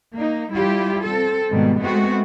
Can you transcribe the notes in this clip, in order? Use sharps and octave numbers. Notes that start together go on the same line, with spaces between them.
A#3 D#4
G3 E4 F4 G4
C4 A4
G#2 B2 D#3 G3
G#3 A3 B3 C4 F#4